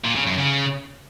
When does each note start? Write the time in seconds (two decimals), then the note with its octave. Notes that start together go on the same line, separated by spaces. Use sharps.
0.04 A#2
0.15 C#3
0.27 F#2
0.38 C#3